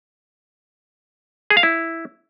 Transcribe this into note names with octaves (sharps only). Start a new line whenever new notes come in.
G#4
F5
E4